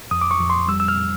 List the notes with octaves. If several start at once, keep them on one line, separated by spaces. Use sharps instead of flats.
F2 D#6
D6
C#6
F2
C6
G3 E6
E6
F6